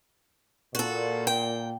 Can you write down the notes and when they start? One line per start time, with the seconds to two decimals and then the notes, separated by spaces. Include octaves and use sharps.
0.75 A#2 F#4 A4
1.27 G5